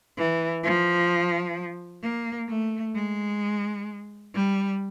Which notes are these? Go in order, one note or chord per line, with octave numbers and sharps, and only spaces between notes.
E3
F3
A#3
A3
G#3
G3